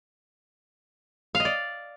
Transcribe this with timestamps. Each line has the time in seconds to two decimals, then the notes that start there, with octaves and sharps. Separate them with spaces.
1.35 F5
1.40 D#5
1.45 D5